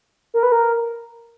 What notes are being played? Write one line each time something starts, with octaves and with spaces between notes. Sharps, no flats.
A#4
B4
A#4